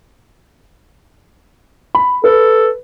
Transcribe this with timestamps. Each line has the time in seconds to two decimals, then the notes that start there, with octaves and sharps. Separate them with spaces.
1.95 B5
2.24 A4 B4